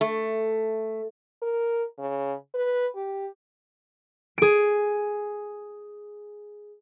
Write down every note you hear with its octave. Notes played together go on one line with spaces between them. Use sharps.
A3
A#4
C#3
B4
G4
G#4 D7